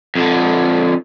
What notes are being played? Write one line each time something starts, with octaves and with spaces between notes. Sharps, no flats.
F2 D3